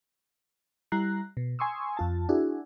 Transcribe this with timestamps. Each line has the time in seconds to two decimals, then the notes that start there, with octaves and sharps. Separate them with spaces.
0.92 G3 E4 A#5 F#6 C7
1.37 B2
1.59 G#5 C6 C#6 D#6 E6
1.97 F2 F4 A5
2.29 D4 E4 F#4 G#4